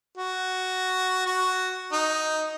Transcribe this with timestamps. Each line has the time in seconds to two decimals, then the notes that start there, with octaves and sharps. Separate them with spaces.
0.18 F#4
1.26 F#4
1.92 D#4